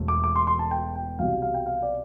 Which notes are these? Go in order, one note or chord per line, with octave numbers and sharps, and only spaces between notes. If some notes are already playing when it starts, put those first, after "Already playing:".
Already playing: E1 E2 A3
D6
D6
C6
C6
A5
G5
G5
C2 B2 G3 F5
F5
G5
F5
D5